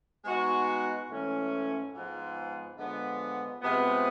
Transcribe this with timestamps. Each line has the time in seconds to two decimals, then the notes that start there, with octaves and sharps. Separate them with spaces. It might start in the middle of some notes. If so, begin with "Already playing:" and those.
0.25 G#3 B3 D#4 F#4
1.09 G#2 E3 A3 C#4
1.93 G#2 F3 G#3 B3
2.77 D3 F3 G#3 B3
3.62 C3 F3 G#3 B3